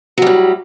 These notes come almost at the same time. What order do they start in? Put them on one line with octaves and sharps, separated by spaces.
F#3 G3 A2